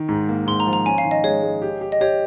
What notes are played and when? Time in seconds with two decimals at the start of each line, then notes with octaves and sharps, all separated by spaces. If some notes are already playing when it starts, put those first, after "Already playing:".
Already playing: D#3
0.09 G#2
0.29 A#3
0.47 G#2 C6
0.60 A#5
0.66 F3
0.73 A#5
0.86 C#4 G#5
0.98 F5
1.04 D#3
1.11 D#5
1.24 G#3 C#5
1.43 G#3
1.62 G4
1.81 G4
1.92 D#5
2.01 G4 C#5